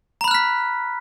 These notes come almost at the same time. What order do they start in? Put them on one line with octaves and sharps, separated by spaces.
A#5 B5 F#6 F6 B6